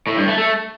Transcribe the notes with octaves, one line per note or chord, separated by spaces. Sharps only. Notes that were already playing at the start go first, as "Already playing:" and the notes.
A2
G2
A3
A3